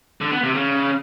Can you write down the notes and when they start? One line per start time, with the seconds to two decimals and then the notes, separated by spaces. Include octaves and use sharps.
0.21 D3
0.32 B3
0.43 C3
0.54 C#3